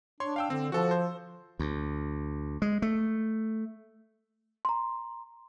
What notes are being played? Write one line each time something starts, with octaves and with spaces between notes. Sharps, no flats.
D4 C#5 C6
F5 G5 E6
D3 C4
F3 F#4 A4
C5
D2
G#3
A3
A#5 C6